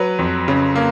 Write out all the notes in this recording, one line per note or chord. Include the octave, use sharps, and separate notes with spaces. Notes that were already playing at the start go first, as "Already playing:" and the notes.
Already playing: F#3 B4
F2
C#3
A#3